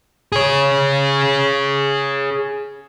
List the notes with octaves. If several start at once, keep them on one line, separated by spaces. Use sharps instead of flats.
G#4 C#5